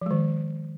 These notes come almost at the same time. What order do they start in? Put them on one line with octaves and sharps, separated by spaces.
F3 G#3 D#3